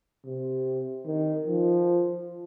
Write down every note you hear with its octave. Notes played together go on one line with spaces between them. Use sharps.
C3
D#3
F3